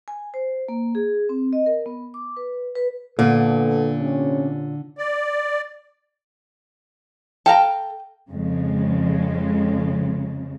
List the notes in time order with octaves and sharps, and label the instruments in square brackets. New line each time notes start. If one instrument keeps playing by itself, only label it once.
[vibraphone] G#5
C5
A#3
G#4
C4
D#5
A#4
B3
D6
B4
B4
[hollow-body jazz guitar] A#2 [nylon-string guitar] D3 [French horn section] B3 A4
[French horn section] C3 C#4
[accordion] D5
[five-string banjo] A4 F5 A#5 [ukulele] G5
[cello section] F2 C#3 F3 G#3